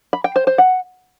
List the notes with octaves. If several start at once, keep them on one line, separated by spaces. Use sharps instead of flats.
B5
G5
C5
C5
F#5